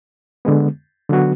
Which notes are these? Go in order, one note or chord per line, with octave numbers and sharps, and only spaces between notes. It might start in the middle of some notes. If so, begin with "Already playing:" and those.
D3 G#3 B3
D3 F#3 B3 F#4